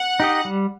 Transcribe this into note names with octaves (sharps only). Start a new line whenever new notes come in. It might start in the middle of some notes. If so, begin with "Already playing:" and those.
Already playing: F#5
D#4 G4 D#5
G3